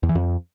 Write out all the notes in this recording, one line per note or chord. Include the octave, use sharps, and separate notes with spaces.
E2
E3
F2